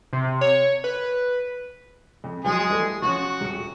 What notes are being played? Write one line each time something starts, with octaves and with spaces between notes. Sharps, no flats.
C3
C#5
B4
F2
F3 F#3 G#3 G#4
E3 G3 A3
F3 C#4 F#4
D#1 C#7